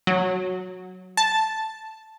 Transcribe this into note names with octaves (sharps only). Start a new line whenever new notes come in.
F#3
A5